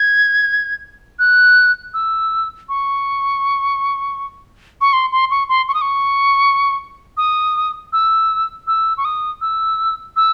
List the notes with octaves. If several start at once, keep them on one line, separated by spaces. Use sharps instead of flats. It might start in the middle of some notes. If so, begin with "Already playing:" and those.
Already playing: G#6
F#6
E6
C#6
C#6
C6
C6
C#6
C6
C#6
D#6
C#6
D#6
E6
E6
C#6
D#6
E6
E6